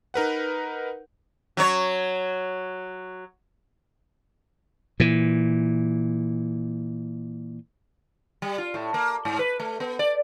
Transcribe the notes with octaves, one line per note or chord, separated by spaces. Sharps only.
D#4 A#4 B4 F#5
F#3 C#5
A#2 E3
G3
F4
A2
A#3
G#2
B4
A3
B3
D5